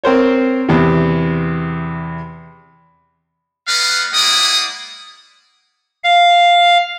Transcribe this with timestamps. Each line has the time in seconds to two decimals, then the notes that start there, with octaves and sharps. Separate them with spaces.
0.04 C4 A#4 C5 C#5
0.69 E2 C3
3.68 G3 B3 B4 D#5 F5 F#5
4.13 G#3 A#3 E4 D5 F#5 D#6
6.04 F5